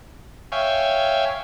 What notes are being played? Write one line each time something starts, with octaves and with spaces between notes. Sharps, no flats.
C#5 E5 F5 G5 G#5